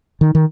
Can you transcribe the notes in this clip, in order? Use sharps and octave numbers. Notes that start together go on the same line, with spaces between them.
D#3
D#3